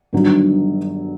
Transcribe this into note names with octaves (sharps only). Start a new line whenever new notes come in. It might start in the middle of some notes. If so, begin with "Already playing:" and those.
G1 G2 D#3 F#3